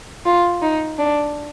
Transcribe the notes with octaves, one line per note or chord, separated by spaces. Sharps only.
F4
D#4
D4